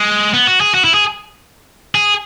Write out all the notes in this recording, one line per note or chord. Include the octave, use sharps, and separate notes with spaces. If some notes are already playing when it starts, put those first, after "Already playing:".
Already playing: G#3
B3
F#4
G#4
F#4
E4
G#4
G#4